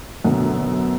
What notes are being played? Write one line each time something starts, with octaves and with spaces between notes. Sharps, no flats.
F#2 B2 D3